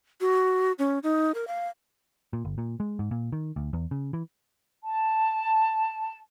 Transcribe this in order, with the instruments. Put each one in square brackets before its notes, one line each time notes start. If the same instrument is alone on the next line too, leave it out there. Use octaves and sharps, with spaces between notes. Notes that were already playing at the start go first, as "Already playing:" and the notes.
[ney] F#4
C#4
D#4
A#4
F5
[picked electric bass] A#2
G1
A#2
G#3
G#2
A#2
D#3
D2
E2
C#3
E3
[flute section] A5